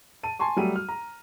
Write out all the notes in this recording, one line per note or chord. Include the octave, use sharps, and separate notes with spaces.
A5 D#7
G#5 A5 C6 C#6
F#3 G3 A3 D#7
F6
A#5